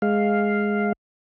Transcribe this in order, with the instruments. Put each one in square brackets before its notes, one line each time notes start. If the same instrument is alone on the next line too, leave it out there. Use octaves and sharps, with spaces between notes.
[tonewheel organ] G#3 F5